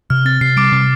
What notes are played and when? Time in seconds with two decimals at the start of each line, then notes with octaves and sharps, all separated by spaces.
0.10 C3 F6
0.25 C4 A6
0.41 C3 C7
0.57 G3 D6 D7
0.72 C3